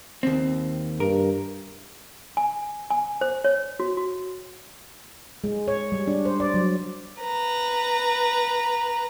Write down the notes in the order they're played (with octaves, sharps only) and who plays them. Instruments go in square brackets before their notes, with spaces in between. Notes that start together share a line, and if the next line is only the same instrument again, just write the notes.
[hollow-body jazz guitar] D#2 C4
[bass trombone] G2 [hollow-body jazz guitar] A#4
[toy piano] G#5
G#5
C5
C#5
F#4
F#4
[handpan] G#3
C#5
G3
D4
C5
D5
F#3
[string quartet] B4 A#5